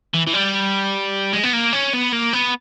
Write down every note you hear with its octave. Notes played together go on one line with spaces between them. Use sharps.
E3
E3
G3
G#3
B3
A#3
C#4
B3
A#3
B3